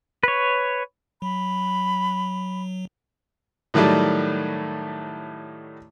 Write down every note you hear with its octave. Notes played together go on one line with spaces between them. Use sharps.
B4 C#5
F#3 B5
A2 D#3 F#3 G3 A3